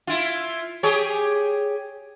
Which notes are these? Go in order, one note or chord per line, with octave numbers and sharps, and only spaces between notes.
E4 F4
G4 G#4 C#5